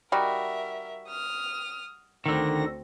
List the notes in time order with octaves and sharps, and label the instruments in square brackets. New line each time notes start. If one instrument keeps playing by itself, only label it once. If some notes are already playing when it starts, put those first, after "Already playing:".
[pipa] G3 D#4 F#4 [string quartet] A#4 E5
[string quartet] D#6 F6
[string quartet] D2 C4 A#6 [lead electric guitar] D3 D#3